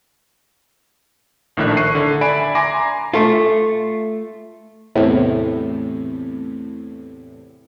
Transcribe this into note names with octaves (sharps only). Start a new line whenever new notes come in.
A#1 A2 D#3 D4 E5 F#6
C#6 F#6 C7 D#7
D3
D5 E5 G#5 B5 D7
G#5 A#5 C6 D6 A#6
A3 F4
E2 A2 C3